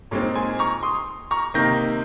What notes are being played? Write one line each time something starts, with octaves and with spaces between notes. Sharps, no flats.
A#2 G#3 C4 D#4 C#5
G#5 C6
A#5 C#6
C6 D#6
A#5 C#6
C3 D#3 A#3 D#4 G6 A#6